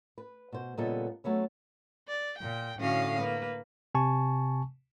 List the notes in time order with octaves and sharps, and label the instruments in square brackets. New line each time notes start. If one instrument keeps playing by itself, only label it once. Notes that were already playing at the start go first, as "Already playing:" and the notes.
[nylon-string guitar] B4
B2 C5
A#2 C#3 G3 B3 A4 D#5
F#3 A3 B3 C#4
[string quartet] D5
A#2 G5
A2 D3 C#4 F#4 F5 D#6
A#3 B4
[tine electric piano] C3 G#5 A5 C#6